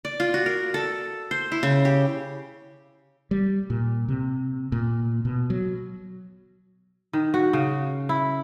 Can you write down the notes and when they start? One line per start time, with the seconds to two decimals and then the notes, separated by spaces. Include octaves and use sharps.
0.05 D5
0.20 F4
0.34 F#4
0.46 A#4
0.74 A4
1.31 C5
1.52 E4
1.63 C#3
1.85 G4
3.31 G3
3.70 A#2
4.08 C3
4.72 A#2
5.25 B2
5.50 F#3
7.13 D#3
7.34 F#4
7.53 C#3
8.09 E4